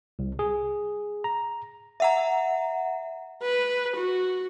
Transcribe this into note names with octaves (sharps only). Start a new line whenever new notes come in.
C2
G#4
A#5
E5 F#5 A#5
B4
F#4